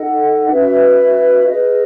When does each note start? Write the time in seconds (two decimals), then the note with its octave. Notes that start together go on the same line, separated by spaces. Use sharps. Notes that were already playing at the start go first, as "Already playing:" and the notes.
Already playing: D#4 A4 D#5 F#5
0.47 C#4 F#4 B4 E5
1.47 G#4 B4 D#5